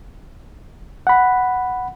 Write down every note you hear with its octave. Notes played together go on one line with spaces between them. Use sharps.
F#5 B5